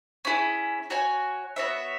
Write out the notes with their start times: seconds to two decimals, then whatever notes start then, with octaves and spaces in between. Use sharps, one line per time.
0.25 C#4 E4 G#4
0.90 F#4 C#5 G#5
1.56 B3 F#4 C#5 E5